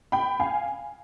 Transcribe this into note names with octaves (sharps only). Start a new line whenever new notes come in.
G5 B5
F5 G#5